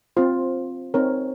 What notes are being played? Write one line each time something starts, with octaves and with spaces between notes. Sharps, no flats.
C4 F4 C5
C4 D#4 A#4 C#5